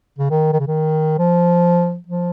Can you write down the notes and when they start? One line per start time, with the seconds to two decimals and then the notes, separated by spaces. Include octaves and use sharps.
0.18 C#3
0.31 D#3
0.52 D#3
0.59 C#3
0.67 D#3
1.18 F3
2.07 F3